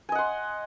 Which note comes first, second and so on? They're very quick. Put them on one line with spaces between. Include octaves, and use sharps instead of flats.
G#5 D#5 F#5 C6